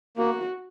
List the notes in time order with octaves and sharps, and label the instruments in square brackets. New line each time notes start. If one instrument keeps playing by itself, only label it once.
[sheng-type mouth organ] A#3 [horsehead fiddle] F#4